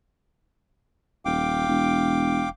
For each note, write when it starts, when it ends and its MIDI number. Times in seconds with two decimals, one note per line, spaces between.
1.25 1.65 27
1.25 2.49 77
1.25 2.49 79
1.25 2.49 86
1.68 2.46 28